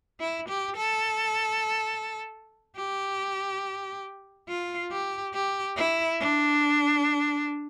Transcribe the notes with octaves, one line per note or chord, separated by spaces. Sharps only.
E4
G4
A4
G4
F4
G4
G4
E4
D4